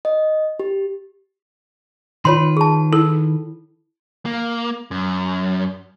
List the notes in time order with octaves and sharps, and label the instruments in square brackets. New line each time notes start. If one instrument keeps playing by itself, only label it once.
[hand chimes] D#5
G4
[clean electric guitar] D#3 B4 [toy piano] F4 C#5 C6
[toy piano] G#4 A5
[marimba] E4 [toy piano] A4
[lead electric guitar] A#3
F#2